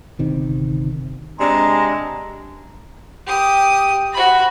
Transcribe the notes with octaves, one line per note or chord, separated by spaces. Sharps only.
G1 C3 D#3
C3 G#3 D4 A#5
G4 D#6
F#4 B5